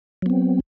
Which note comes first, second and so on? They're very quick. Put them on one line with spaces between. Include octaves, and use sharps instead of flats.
F#3 B3 C4